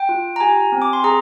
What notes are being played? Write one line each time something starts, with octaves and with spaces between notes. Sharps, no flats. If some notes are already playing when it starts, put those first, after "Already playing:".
Already playing: G5
F4
A#5
G4 G#5
C4
D6
C6
G#4 A#5